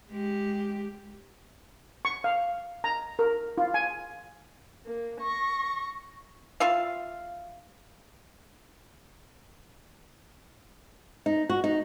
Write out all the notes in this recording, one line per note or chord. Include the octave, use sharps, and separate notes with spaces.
G#3 G4
C#6
F5
A#5
A#4
F4
G#5
A#3
C#6 A#6
F4 E5 F5
D#4
F#4
D#4